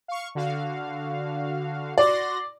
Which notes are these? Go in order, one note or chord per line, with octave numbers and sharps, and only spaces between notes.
F5 C#6
D3 F#4 F5
F#4 D5 C6 A#6